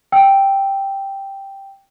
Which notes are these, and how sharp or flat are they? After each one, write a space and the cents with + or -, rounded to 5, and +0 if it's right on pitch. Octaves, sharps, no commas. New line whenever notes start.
G5 +0 E6 +0